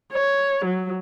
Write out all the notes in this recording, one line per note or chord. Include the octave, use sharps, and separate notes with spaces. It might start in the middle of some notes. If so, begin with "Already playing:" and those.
C#5
F#3